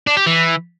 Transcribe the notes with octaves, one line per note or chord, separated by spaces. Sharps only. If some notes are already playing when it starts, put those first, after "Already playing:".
D4
G4
E3